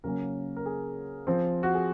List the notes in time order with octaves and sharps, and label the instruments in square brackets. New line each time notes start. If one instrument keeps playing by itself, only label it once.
[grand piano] C#3 F#3 A#3 C#4 A#4
A#4
G#4
F3 C4
F#4
G#4